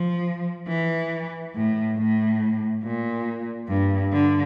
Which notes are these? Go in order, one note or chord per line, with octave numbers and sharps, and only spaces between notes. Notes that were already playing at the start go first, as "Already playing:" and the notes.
Already playing: F3
E3
A2
A2
A#2
G2
D3